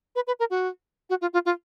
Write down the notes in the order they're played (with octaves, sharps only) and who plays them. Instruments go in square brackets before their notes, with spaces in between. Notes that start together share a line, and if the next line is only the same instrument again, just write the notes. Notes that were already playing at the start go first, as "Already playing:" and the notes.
[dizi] B4
B4
A#4
F#4
F#4
F4
F4
F4